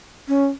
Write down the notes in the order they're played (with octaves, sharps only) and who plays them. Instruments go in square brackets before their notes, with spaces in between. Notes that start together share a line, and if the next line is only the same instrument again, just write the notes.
[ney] C#4